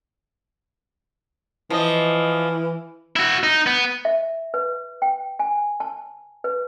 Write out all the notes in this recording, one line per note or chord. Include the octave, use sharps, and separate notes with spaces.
E3 F3 D#5
E4 F#4
D#4
B3
E5
B4
G5
G#5
A5
B4